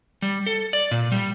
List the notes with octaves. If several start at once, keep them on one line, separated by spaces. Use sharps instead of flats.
G3
A4
D5
A#2
G3